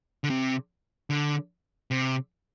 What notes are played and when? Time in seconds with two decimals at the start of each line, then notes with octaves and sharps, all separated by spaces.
0.24 D3
0.30 C3
1.10 D3
1.91 C3